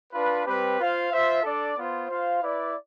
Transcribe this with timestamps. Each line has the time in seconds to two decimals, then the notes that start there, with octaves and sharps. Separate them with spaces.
0.12 D4 F4 B4
0.45 G3 C4 G4 B4
0.78 F4 C5 F5
1.11 F4 C5 E5
1.43 D4 A4 D5
1.77 B3 F4 C5
2.09 F4 C5 F5
2.42 E4 B4 D5